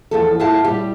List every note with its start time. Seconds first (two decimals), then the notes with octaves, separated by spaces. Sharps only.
0.11 E2 F3 A4
0.40 E4 F4 G4 F5 F#5 A5
0.65 G3 G4